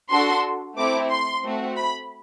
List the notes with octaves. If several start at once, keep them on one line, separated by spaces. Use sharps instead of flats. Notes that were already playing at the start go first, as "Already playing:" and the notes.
D4 F#4 A4 C6
A3 C4 E4 D6
C6
A3 C4 F#4
B5